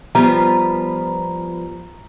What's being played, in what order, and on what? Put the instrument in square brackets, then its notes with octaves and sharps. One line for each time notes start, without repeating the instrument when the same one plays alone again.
[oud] F3 G3 B3 [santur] A#5